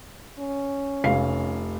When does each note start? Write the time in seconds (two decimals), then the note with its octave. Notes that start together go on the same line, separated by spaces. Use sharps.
0.39 C#4
1.04 F1 F5 C7